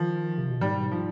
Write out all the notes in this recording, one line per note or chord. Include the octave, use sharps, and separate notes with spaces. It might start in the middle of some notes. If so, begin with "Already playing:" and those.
Already playing: D#3 F3
C3
B2
G#2 G3
F3